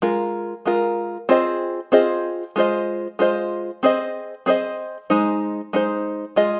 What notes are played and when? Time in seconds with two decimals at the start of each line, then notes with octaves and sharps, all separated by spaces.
0.02 G#3 F4 A#4
0.65 G#3 F4 A#4
1.29 C4 F4 G#4 C5 D#5
1.92 C4 F4 G#4 C5 D#5
2.56 G#3 F4 C5 D#5
3.19 G#3 F4 C5 D#5
3.83 C4 G#4 C5 D#5
4.46 C4 G#4 C5 D#5
5.10 G#3 D#4 C5
5.73 G#3 D#4 C5
6.36 G#3 F4 G#4 D#5